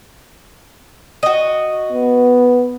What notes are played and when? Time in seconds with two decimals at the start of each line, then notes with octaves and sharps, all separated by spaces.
1.23 F#4 D#5
1.92 B3